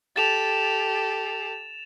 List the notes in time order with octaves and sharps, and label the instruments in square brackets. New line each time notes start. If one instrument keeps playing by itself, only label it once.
[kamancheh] G4 A4 [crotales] A6 E7 F7